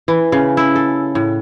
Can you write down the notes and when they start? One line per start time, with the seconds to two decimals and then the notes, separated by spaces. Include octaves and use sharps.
0.08 E3
0.32 C#3
0.57 E4
0.75 A4
1.15 A2